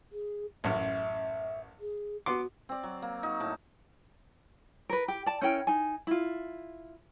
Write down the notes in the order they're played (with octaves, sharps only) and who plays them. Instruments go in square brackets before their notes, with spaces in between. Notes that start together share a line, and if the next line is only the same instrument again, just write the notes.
[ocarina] G#4
[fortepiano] A1 F#2 [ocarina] E5
[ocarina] G#4
[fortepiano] B3 C6 D6 [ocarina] F#4
[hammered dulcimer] C4 D5
F#3
A#3
D#4 F#4
A2 A5
[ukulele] A#4 B4
G4
D5 A5
C#4 E4 A#4 G5
D#4 G#5
E4 F4